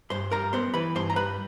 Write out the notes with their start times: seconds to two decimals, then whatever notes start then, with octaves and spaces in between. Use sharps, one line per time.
0.10 G2 C5 C6
0.31 G3 A#4 A#5
0.53 B3 C5 C6
0.74 E3 B4 B5
0.95 G2 C5 C6
1.10 A#5
1.16 G3 B4 B5